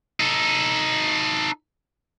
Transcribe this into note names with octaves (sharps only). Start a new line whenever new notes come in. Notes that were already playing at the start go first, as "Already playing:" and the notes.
D#4 A4